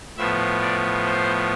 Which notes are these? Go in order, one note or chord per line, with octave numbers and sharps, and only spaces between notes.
A2 F3 B3 E5
D5
C5